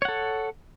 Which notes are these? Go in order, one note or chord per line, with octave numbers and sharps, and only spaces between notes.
A4 C#5 F#5